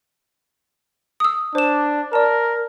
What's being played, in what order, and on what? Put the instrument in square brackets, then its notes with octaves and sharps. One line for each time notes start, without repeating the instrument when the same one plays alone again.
[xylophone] D#6 E6
[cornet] D4 [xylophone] C5 E7
[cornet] A#4 [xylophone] D5 A5